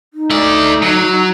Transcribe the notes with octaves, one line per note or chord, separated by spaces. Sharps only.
D#4
A3 D5
F#3